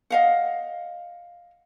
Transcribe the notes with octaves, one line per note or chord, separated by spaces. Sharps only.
D#5 F5 F#5